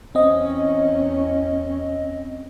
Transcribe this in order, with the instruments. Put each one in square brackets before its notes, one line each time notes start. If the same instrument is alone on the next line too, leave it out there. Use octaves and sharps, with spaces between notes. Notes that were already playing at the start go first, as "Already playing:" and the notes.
[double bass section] E2 C#4 [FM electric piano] C4 D#5